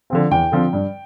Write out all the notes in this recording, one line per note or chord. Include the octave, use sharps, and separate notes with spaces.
D3 F3 C4
E2 G5
D3 F3 C4
G2